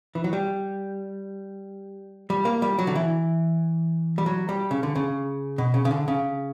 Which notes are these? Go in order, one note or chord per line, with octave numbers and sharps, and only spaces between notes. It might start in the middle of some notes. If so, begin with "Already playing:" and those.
E3
F#3
G3
G3
A#3
G3
F#3
D3
E3
G3
F#3
G3
C#3
D3
C#3
B2
C#3
C#3
D3
C#3